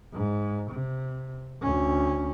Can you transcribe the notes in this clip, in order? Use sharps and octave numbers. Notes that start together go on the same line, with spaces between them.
G#2
C3
D2 C#4